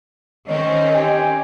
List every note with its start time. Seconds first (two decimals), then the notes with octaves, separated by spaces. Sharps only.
0.48 D#3 C4 C#4 C#5 D#5
0.94 G4 G#5